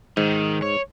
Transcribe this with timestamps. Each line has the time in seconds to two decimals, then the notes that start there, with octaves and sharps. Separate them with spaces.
0.17 G#2 D#3 D#4
0.62 C#5